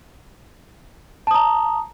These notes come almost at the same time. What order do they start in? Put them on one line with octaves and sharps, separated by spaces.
A5 D#6 A#5